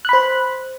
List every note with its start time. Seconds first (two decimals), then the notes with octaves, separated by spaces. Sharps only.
0.05 F#6
0.09 B5
0.13 C5